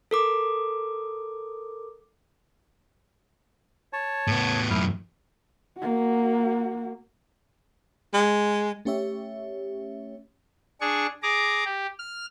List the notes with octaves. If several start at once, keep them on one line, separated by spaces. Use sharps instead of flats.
A4 A#4 D6
C#5 A5
A2 B3
F#2 A2 E4 F6
A#3 F#4
G#3
A3 C#4 G4 C#5 E5
D4 G#4 C#6
G#4 A#5 D6
G4
F6